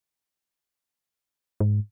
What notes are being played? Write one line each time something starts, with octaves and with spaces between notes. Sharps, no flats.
G#2